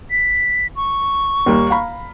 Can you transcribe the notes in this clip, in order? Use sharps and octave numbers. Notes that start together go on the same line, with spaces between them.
B6
C#6
D#2 G3 A#3
F5 A#5 B5